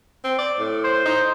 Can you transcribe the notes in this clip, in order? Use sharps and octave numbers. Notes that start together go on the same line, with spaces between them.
C4
D5
A2
C5
D#4